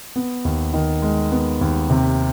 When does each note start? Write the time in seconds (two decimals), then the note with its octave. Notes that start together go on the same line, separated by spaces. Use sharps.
0.16 B3
0.45 D#2
0.74 D#3
1.02 G#3
1.31 B3
1.61 D#2
1.90 C3